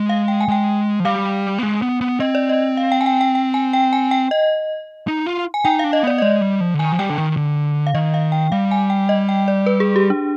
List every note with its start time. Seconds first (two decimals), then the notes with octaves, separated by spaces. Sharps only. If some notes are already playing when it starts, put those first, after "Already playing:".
Already playing: G#3
0.09 F5
0.28 G5
0.40 G#5
0.48 G#3 G5
1.00 F3
1.05 G3 F5
1.59 B3
1.63 G#3
1.82 B3
2.01 B3
2.20 C4 D#5
2.35 D5
2.49 D#5
2.77 F5
2.92 G5
3.01 G#5
3.06 G5
3.21 G5
3.35 G5
3.54 G#5
3.73 G5
3.93 G#5
4.11 G5
4.31 D#5
5.08 D#4
5.26 F4
5.54 G#5
5.65 D#4 G5
5.79 F5
5.84 D4
5.93 D#5
6.03 B3 D5
6.18 D#5
6.22 G#3 D5
6.41 G3
6.61 F3
6.74 D3
6.79 D#3 G#5
6.92 F3
6.99 G3 G5
7.10 D3
7.18 D#3
7.37 D3
7.87 F5
7.94 D#3 D#5
8.14 F5
8.32 G5
8.52 G3 F5
8.71 G#5
8.90 G5
9.09 D#5
9.29 G5
9.48 D5
9.66 B4
9.80 G#4
9.96 G4
10.10 D4